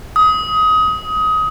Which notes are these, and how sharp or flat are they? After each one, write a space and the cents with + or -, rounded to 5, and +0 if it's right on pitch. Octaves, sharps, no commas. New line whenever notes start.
D#6 +20